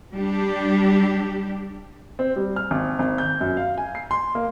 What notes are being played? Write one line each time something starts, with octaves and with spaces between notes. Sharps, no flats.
G3 D4 G4
C4
G3
F6
G#1
G#1
G6
F#2
F5
G#5
C7
C6
A#3